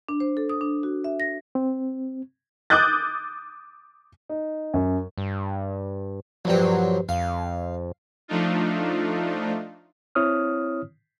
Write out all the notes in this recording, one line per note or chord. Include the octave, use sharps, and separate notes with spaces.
D4
C5
A4
D#6
D4
F#4
E5
A#6
C4
D6 D#6 F#6 G6 A6
D#4
F#2
G2
A#1 G2 F#3 C4
F2 F5
F3 A3 D4 D#4 F4
C4 E4 C#5 D#6 F6